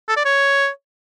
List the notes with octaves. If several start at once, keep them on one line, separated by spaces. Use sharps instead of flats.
A4
D5
C#5